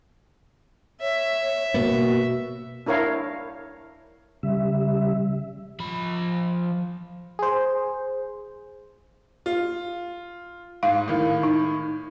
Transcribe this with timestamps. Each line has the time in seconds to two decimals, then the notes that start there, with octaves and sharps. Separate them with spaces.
1.01 C#5 E5
1.74 B2 A#3 B3 F#4
2.86 D4 E4 A#4 C#5 F5
4.43 C#3 G3 E5
5.80 F3 B5
7.39 G#4 C5
9.46 F4
10.83 G#2 F5
11.08 A2 D#3
11.43 D#4